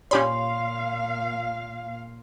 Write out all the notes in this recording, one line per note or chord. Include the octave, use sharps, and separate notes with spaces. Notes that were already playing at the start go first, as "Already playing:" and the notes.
A#2 C#4 G4 C#5 F5 B5 C6